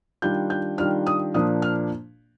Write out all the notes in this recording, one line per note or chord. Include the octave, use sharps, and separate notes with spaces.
D#3 G3 D4 F4 G6
G6
D#3 G3 D4 F4 F6
D#6
A#2 F3 A#3 D4 D#6
F6